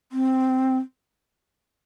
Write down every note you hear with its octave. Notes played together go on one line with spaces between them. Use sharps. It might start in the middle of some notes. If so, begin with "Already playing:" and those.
C4